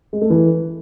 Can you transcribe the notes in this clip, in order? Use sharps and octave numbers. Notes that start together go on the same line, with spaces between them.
G#3
A3
E3